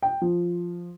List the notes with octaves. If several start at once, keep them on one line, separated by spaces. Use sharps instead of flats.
G5
F3